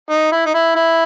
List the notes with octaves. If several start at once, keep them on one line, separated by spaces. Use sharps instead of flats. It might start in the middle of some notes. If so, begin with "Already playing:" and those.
D#4
E4
D#4
E4
E4